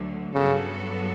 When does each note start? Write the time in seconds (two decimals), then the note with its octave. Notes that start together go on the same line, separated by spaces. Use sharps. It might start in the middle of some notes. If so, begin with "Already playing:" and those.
Already playing: D2 D3 F#3
0.34 G2 C#3 F#3 B3 F#4 A4